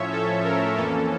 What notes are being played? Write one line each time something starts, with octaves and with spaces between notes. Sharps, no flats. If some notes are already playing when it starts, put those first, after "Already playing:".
Already playing: A2 F3 C#4 C#5 E5
A4
A#4
F2 E3 A#3 C#4 A4